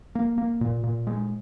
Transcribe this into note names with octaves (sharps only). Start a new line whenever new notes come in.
A#3
A#3
A#2
A#2
G#3